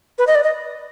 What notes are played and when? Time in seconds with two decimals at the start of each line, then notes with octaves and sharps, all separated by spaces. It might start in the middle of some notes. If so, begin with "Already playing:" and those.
0.18 B4
0.27 D#5
0.35 D5
0.44 D#5